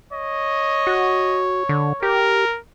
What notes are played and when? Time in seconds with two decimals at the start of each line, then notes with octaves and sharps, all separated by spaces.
0.13 C#5 D#5
0.87 F#4
1.69 D3
2.03 G4 A#4